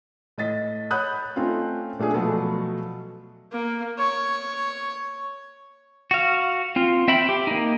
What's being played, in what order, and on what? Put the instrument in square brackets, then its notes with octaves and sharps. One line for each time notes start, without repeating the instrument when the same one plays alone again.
[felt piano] A2 D#5 A6 B6
C#5 F#5 B5 D#6 F#6 G6
A3 C4 C#4 D#4 F4
A#2 A3 D4 G#4
B2 F3 F#3 A3 B3
[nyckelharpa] A#3
C#5
[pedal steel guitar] F#4 F5
C4 F4
C4 E5 G5 B5
G4
A#3 D#4